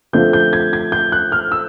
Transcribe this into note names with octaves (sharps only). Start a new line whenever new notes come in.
D3 F3 A3 C4 G6
G6
G#6
G#6
G6
F#6
F6
E6